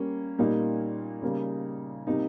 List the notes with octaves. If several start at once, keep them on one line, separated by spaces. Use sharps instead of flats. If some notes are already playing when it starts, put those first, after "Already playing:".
Already playing: G3 A#3 C#4
A#2 G3 A#3 D#4
C#3 G3 A#3
C3 G3 A#3 D#4